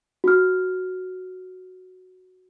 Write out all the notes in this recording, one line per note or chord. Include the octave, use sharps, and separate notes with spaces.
F#4 F6